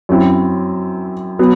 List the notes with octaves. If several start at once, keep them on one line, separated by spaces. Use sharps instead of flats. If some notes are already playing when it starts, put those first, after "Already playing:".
F#2 F#3 C4 E4
F#3 B3